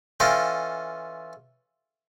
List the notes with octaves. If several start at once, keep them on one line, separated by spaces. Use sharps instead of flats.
E3 C#4 F4 A4 D#5 G5